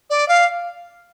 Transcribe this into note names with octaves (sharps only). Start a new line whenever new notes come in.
D5
F5